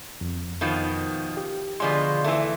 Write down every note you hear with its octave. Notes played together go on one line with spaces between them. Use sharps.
F2
B2 D#3 F3
G4
B2 D3 F3 G#3 D5 C6
E3 A3